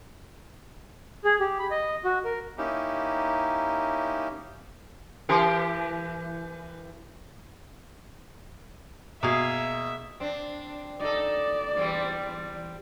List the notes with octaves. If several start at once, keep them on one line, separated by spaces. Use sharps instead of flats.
G#4
G4
B5
D#5
F#4
A#4
A#3 C#4 D#4 E4 G4
E3 G4 A#4
B2 A#3 G#4 E5 F5
C4 D4
D#4 A4 D5
E2 G3 C4